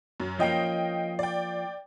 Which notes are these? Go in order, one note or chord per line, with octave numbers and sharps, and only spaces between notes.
F#2
F3 A#3 C#4 D#5 G5
D5 G5